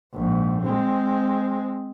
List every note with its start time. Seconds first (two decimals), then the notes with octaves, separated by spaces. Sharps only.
0.14 A#1 G#2
0.63 G#3 C4